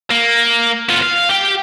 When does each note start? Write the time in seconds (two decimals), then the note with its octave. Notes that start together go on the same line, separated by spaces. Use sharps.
0.10 A#3
0.89 B3 F4
1.02 F5
1.29 G4 G5